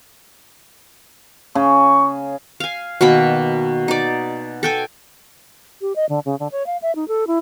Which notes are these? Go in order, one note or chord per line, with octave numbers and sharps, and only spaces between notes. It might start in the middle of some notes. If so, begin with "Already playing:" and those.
C#3 C#6
F5 G#5
B2 D#3 A#3 B5
D#4 D5
A4 G5 G#5
G4
D#5
D3
C#3
D3
C#5
F5
E5
D#4
A4
E4